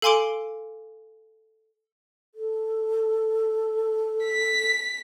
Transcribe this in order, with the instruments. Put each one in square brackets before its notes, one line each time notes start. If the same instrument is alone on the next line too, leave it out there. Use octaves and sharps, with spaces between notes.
[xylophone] A4 F5 G#5 C6 D6 D7
[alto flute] A4
[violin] B6